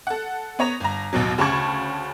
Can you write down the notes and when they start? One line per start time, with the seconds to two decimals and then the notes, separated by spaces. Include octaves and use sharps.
0.07 A4 F#5
0.59 B3 C#5 A#5 F7
0.80 G1 A#5
1.13 A1 D#2 B2 F#3
1.38 D2 C#3 A5 B5 C#6 G#6